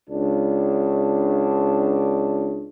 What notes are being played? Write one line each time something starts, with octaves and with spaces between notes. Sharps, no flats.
C#2 D4